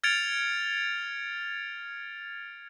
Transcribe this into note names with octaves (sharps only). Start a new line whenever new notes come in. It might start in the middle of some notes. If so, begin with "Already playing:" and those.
F6 G#6 A6 C#7 D7 F7